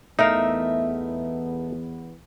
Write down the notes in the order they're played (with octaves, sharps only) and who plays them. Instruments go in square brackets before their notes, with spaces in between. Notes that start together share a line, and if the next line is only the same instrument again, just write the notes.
[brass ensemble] E2 B3 [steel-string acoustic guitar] A3 E5 [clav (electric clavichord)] D#4 A#4 F5